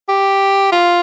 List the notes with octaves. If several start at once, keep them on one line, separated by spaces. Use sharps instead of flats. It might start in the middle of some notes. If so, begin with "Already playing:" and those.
G4
F4